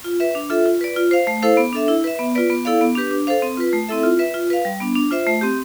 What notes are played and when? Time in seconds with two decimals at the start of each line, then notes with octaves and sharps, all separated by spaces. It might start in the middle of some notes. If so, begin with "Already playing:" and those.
0.04 F4
0.20 B4 E5
0.35 D4
0.50 F4 A4 E5
0.66 F4
0.81 B4 D5
0.96 F4
1.11 C5 F5
1.27 A3
1.42 E4 A4 C5 F5
1.57 B3
1.73 D4 A4 E5
1.88 E4
2.04 B4 E5
2.19 B3
2.35 F4 B4 D5
2.50 B3
2.65 E4 A4 D5 F5
2.81 B3
2.95 D4 G4 B4
3.11 D4
3.27 A4 C5 F5
3.42 C4
3.57 F4 B4
3.73 A3
3.88 C4 E4 A4 E5
4.03 F4
4.19 B4 E5
4.34 F4
4.50 B4 F5
4.65 G3
4.80 B3 D4
4.95 D4
5.11 F4 C5 E5
5.27 A3
5.41 C4 G4